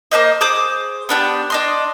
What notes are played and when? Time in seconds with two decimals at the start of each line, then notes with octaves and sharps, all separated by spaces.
0.11 A#3 D#4 C5 D#5
0.41 G#4 C5 D6 D#6
1.09 B3 D4 F4 G4
1.50 D4 D#5 C6